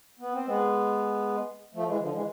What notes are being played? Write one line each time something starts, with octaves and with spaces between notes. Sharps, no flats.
B3
C4
G#3 B3
F3 A3
E3 G#3
D3 F3
E3 G#3